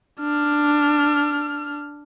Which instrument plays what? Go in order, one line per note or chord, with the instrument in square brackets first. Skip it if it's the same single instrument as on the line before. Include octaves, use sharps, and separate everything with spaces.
[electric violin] D4 F6